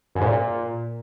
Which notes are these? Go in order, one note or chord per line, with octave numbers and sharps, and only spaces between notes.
F#2
G#2
A#2